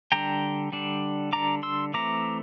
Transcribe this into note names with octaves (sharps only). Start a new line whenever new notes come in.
D3 G3 D4 G5 A#5
D3 G3 D4
D3 G3 D4 A#5 D6
C6 E6
E3 A3 C4 A#5 D6